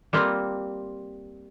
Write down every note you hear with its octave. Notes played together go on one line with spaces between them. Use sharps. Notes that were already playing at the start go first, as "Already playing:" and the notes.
G3 A#3 C4 F4